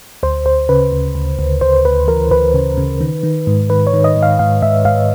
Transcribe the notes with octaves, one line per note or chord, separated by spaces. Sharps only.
D2 C5
D2 C5
C#3 B4
D2
D2
D2
D2 C5
D2 B4
E3 A#4
D2 B4
C#3
C#3
D#3
D#3
G#2
D#3 B4
C#5
D#3
D#5
G#2
F5
G#2 F5
G#2 E5
G#2 F5